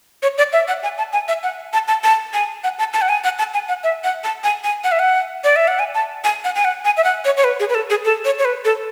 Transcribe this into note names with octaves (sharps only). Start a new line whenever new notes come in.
C#5
D5
E5
F#5
G#5
A5
G#5
E5
F#5
A5
A5
A5
G#5
F#5
A5
A5
F#5
G#5
F#5
A5
G#5
F#5
E5
F#5
A5
G#5
G#5
F#5
E5
F#5
D5
E5
F#5
G#5
A5
G#5
F#5
G#5
F#5
G#5
E5
F#5
C#5
C#5
B4
G#4
B4
A4
G#4
A4
C#5
C#5
B4
A4